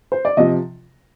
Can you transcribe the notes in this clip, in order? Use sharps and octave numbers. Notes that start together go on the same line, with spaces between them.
C5
D5
C3 F3 D#5